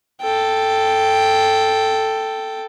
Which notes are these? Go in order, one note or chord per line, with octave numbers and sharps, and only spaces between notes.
A4 G5